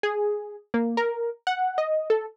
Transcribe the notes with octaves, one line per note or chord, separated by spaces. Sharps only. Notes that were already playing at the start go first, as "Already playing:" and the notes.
G#4
A#3
A#4
F#5
D#5
A4